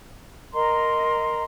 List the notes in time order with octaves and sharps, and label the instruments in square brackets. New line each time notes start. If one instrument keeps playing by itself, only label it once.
[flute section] A#4 D#5 A#5 C6